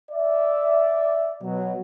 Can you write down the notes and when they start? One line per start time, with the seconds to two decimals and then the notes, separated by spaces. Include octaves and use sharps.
0.11 D5 E5
1.43 B2 F#3